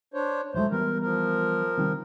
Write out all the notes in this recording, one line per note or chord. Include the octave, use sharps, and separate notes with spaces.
D4 C5 C#5
E1 F#3 G#3 A3 C5
E3 G3 B3 A#4
F3 A#4
C3 D#3 G3